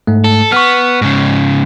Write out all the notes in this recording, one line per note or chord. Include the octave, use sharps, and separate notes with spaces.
G#2 A3
A4
B3 C#6 F6
G#2 C#3